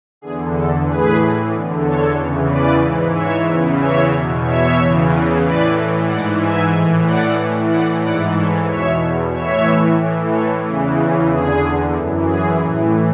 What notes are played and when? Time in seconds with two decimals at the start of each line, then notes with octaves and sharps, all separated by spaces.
0.21 E2 D3 G#4
0.55 A4
0.86 A2 E3 G#4 B4
1.52 E2 D3
1.84 A4 C#5
2.17 E2 C#3 E3
2.50 B4 D5
2.82 G#2 E3
3.15 C#5 E5
3.48 E2 C#3 E3
3.80 C#5 E5
4.13 E2 B2
4.45 C#5 E5
4.78 E2 C#3 E3
5.43 A2 E3 B4 D5
6.08 G#2 E3 D5 F#5
6.40 E5 G#5
6.73 A2 E3
7.06 D5 F#5
7.39 A2 E3
7.71 D5 F#5
8.04 G#2 E3 D5 F#5
8.36 A4 C#5
8.69 E2 B2 C#5 E5
9.34 A2 E3 C#5 E5
10.00 A2 E3
10.32 A4 C#5
10.64 E2 C#3 E3
11.30 E2 D3 G#4
11.95 F#2 E3
12.27 G#4
12.60 A2 E3